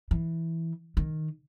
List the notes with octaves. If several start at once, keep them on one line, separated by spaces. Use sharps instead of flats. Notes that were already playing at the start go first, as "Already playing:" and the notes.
E3
D#3